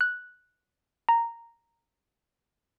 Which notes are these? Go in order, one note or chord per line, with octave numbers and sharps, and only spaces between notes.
F#6
A#5